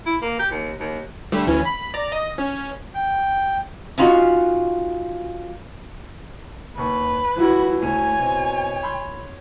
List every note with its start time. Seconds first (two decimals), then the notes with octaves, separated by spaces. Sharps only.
0.06 E4
0.22 A#3
0.39 G4
0.51 D#2
0.80 D#2
1.32 D3 G3 A3
1.47 D2 E3 C#4
1.65 B5
1.94 D5 A#5
2.12 D#5
2.38 C#4
2.95 G5
3.98 C#4 D#4 F4 F#4
6.78 D#2 B4 C#6
7.36 G1 E3 E4 F#4
7.82 D2 C#5 G#5 D#7
8.18 B2 C4
8.83 B5 C6 G6